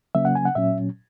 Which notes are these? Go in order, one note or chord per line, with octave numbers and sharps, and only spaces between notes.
C#3 F#3 A#3 C#4 E5
F#5
G#5
F#5
A#2 F#3 C#4 E5